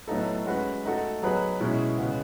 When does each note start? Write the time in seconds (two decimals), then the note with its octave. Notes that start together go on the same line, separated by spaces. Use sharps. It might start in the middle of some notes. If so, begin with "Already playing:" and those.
0.08 A2 F#3 B3 D#4 A4
0.46 G#3 C#4 F#4 B4
0.85 A3 D#4 F#4 A4
1.22 F#3 B3 D#4 G#4 B4
1.60 B2 G#3 C#4 E4
1.98 C#3 G#3 B3